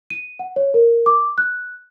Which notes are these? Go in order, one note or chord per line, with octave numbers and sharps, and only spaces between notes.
D#7
F#5
C#5
A#4
D6
F#6